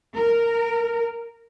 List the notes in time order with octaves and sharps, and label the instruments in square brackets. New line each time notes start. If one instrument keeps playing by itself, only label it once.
[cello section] A#4